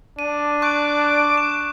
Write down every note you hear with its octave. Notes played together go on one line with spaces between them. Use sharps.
D4 D#7
C#6 D6 F#6
E7